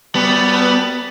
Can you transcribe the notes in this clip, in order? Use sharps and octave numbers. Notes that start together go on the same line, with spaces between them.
F#2 G3 B3 A5